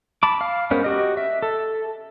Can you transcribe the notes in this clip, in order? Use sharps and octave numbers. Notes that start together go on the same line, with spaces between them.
A5 B5 D6
F5
G#3 B3 C#4 A#4 C5
F#4 G4 D#5
E5
A4